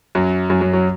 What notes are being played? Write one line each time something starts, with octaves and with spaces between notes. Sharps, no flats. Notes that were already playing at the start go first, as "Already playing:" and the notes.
F#2 F#3
F#2 F#3
F#2 F#3
F#3